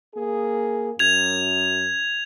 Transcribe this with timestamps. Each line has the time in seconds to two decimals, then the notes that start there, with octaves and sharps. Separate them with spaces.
0.15 A#3 G#4
0.99 F#2 G#6 F7